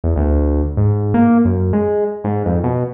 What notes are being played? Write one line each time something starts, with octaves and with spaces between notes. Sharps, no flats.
E2
D2
G#2
A#3
F#2
G#3
G#2
F2
B2